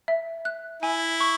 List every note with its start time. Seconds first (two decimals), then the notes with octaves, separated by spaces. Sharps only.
0.08 E5
0.45 F#6
0.82 E4 G#5
1.20 C#6